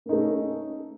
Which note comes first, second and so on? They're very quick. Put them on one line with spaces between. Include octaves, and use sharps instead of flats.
A#3 D#4 A3 C#4